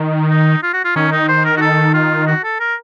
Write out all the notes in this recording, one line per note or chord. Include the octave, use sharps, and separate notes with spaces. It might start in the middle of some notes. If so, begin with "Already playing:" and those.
Already playing: D#3
D#4
F4
F#4
F4
D#3 C#4
D#4
C5
A#4
F#4
A4
F4
F#4
A4
A#4